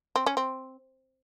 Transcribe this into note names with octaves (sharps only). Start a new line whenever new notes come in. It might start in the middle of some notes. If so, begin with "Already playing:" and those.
C4
C#4
C4